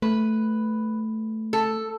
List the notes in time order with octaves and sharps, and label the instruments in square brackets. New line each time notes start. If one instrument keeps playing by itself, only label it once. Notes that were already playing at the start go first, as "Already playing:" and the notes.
[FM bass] A3 [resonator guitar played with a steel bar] B4
[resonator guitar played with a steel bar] A4